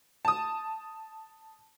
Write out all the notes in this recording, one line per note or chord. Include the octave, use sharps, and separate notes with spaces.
A5 D#6